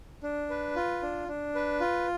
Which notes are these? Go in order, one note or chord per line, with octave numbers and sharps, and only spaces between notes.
D4
B4
F4
D4
D4
B4
F4